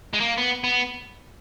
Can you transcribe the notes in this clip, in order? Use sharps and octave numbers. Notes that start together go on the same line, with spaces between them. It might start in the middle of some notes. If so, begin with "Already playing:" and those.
G#3
A#3
B3
B3